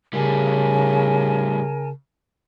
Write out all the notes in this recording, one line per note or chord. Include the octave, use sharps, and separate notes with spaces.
A2 C#3 G3 A#4 G#5 A5